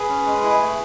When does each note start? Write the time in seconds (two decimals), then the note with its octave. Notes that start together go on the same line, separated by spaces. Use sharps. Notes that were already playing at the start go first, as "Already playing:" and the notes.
Already playing: G#4 B4
0.09 C#4
0.26 G#3
0.43 E4
0.61 A3